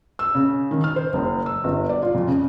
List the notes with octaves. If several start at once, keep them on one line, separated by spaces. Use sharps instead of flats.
E6
C#3
D#3
F6
C5
F#1
E6
G1
D5
F4
F2
C#3